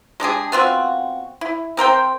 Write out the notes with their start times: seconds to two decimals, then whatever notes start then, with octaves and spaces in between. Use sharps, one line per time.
0.20 G#3 D4 G4 G#4
0.52 B3 C4 F4 F#4
1.41 E4
1.77 C4 A#4 C5 G5